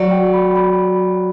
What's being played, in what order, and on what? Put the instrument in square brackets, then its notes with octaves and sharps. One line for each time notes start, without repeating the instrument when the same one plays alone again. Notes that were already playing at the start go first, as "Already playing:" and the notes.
Already playing: [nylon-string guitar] F#3 [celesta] D5
[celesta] G5
B5
B5